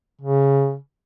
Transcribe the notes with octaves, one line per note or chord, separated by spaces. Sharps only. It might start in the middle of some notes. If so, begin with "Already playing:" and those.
C#3